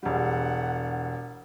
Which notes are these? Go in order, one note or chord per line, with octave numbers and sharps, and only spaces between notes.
E1 G3 F#5